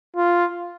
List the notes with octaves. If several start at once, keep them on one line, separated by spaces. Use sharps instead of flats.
F4